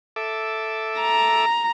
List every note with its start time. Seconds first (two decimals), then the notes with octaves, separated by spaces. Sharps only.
0.16 A4 E5 D6
1.01 A#5